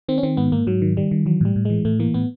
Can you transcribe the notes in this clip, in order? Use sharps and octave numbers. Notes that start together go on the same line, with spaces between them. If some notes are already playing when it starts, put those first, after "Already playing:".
D#3 C4
C#4
D#3 C4
G#2 B3
G#2 A#3
G#2 F#3
D#3
D#3 G3
D#3
E3 F#3
A2 G3
A2
E3 G#3
A2 A3
E3 A#3
A2 B3